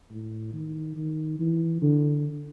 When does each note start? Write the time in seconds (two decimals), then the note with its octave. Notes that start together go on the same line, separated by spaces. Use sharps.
0.11 A2
0.53 D#3
0.96 D#3
1.39 E3
1.82 D3